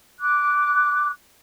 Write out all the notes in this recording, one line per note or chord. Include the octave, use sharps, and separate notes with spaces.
D6 F#6